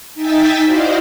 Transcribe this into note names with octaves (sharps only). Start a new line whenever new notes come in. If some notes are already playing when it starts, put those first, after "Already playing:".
D#4 E5 G5 G#5 A6 B6
E4 F#4 C5 D5 D#5 F5